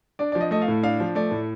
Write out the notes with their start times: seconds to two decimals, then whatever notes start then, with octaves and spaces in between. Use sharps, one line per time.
0.19 D4 D5
0.32 F3 D5
0.41 D#5
0.51 A3 D#5
0.62 F5
0.68 A2
0.83 D4 F5
1.00 F3
1.15 A3 D5
1.31 A2